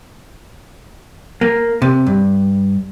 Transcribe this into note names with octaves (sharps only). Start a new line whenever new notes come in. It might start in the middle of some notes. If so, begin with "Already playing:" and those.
A#3
C3
G2